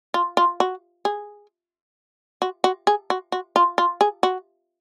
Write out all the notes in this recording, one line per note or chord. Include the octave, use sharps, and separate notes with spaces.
F4
F4
F#4
G#4
F#4
F#4
G#4
F#4
F#4
F4
F4
G#4
F#4